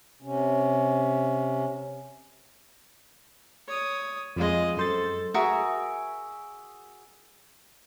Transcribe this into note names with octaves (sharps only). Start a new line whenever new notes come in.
C3 C#4
C#5 D#6
F2 G#3 F4 D#5
F#2 A4 C5 A6
F#4 G#4 A#4 E5